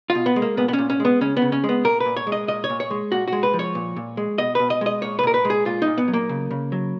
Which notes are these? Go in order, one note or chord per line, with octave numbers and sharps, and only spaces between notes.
F4
B2
B3
G#3
A#3
A#2 B3
B3
C#4
A#2
C#4
G#3
B3
C#3 C#4
B3
C#3
C#4
G#3
B3
A#2 A#4
B4
A#2
C#5
G#3
D#5
A#2 D#5
C#5
A#2
C#5
G#3
A#2 F#4
G#3 F#4
B4
F3
C#5
A#2
A#2
G#3
B2 D#5
B2 B4
D#5
G#3 D#5
A#2 C#5
B4
A#2 A#4
B4
G#3
G#4
A#2 F4
D#4
A#2
B3
F#3
A#3
C#3
C#3
F#3